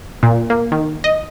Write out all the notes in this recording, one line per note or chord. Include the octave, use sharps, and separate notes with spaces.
A#2
A#3
D#3
D#5